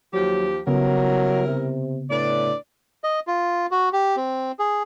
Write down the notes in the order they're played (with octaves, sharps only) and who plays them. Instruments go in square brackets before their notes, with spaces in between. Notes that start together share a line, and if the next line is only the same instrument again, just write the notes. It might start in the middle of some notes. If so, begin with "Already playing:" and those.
[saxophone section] D#2 F3 G4 [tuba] F#3
[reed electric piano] C#3 B3 [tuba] F#3 [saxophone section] G3 E4 A#4
[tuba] C3
[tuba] A2 [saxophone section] D4 B4 D5
[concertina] D#5
F4
F#4
G4
C4
G#4